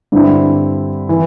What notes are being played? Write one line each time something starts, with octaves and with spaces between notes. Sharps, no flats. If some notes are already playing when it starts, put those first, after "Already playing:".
G2 D3 C4 E4
E3